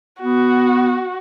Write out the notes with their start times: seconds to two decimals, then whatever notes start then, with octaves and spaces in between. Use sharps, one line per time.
0.21 B3 F#4